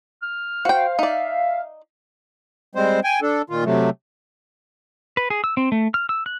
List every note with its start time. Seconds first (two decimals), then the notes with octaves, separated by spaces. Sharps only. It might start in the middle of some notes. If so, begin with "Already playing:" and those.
0.22 F6
0.65 F#4 C5 F5 G5
0.99 D#4 D5 E5
2.75 G3 G#3 C4 C5
3.04 G5 G#5
3.22 D4 A4
3.50 A#2 D#3 F4
3.65 C3 F#3 A3
5.17 B4
5.30 G#4
5.44 E6
5.57 C4
5.72 A3
5.94 F6
6.09 E6
6.26 F#6